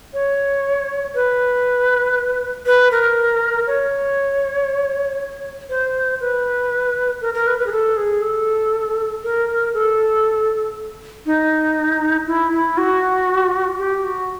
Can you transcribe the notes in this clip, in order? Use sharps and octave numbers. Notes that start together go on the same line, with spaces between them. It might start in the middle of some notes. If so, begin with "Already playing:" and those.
C#5
B4
B4
A#4
C#5
C5
B4
A#4
A#4
B4
B4
G#4
A4
G#4
A4
A#4
A4
D#4
E4
E4
F#4
G4
F#4